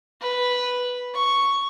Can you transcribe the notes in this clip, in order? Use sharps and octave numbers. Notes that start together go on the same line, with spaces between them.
B4
C#6